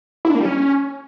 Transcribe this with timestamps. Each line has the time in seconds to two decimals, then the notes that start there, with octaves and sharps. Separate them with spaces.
0.25 E4
0.30 D4
0.35 A#3
0.40 G3
0.45 C#4